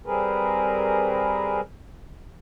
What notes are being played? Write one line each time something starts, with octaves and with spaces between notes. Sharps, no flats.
G3 C4 G#4 A#4 B4